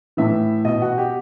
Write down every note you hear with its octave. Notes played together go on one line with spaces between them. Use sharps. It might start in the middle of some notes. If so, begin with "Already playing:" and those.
A2 E3 E5
B2 D#5
F#4
G4